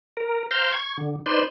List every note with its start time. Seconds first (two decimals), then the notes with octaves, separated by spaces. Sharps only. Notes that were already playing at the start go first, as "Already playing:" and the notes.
0.17 A#4
0.51 C5 F5 G5 A#5 C6
0.72 C#6 G#6
0.97 D3
1.26 D#4 B4 C5 D5 C6